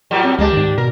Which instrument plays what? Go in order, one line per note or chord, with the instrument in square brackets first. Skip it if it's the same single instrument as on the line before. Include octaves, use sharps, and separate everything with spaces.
[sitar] A2 F#3 G3
[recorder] C4
[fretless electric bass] C#2 G#3 [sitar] A#3 D4 [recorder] G4
[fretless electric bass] G#2 D#3
[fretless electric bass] B2 [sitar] A#4